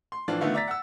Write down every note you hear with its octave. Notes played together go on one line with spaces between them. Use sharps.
C6
A2 E3 F3 D4 F4
D3 D#3 A3 B3 F4
D5 E5 A#5 A6 B6
F#5 E6